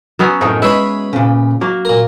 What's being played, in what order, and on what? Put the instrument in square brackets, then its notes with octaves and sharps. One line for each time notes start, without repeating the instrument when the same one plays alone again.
[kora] F#3 B3 C#4
[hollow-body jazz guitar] F#2 A2 D#3 [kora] D#4
[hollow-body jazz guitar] G#3 [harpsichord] B4 C#5 B5 [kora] E5
[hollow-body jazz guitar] A#2 C#3
[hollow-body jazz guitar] F#3 [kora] A#3
[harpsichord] A#2 A#4